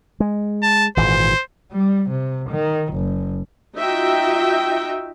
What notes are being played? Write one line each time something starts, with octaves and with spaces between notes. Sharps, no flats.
G#3
A5
G#1 A#2 E3 C5
G3
C3
D#3
F#1
D#4 F4 F#4 E5 G5